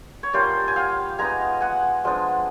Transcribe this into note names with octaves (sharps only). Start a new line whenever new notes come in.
C#5
G3 A#3 C#4 F4 C5 D5
G#5
F5 G5
G#3 B3 D#4 G#5 A#5
F#5 G#5
F3 G#3 B3 D4